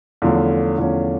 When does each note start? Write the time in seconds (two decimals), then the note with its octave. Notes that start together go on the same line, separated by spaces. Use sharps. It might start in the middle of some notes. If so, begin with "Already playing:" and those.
0.22 E2 D3 F3 A3 C#4
0.78 E2 D3 F3 A3 C#4